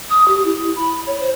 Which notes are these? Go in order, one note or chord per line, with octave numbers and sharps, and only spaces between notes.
D#6
G4
E4
B5
C#5
C5